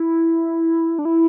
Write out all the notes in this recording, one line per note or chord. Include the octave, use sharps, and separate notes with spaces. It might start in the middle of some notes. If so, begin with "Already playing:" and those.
Already playing: E4
D4
E4